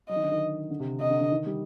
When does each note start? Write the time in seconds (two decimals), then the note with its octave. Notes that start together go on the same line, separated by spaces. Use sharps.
0.09 F#3 D#5
0.16 D#3
0.23 D3
0.31 D#3
0.70 D3
0.80 C3
1.00 C3 D#5
1.10 D3
1.21 D3
1.32 D#3
1.46 G3